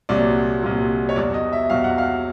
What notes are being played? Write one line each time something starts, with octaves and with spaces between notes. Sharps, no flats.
C2 A#2 F#3 D5
C2 A#2 F#3
C#5
E2 B2 F#3 D5
D#5
E5
E2 B2 F#3 F5
F#5
F5